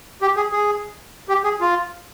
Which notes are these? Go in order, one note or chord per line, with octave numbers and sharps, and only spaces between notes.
G4
G#4
G#4
G4
G#4
F4